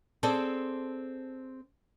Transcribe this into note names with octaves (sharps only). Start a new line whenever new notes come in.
C4 G#4 A4 C5 D5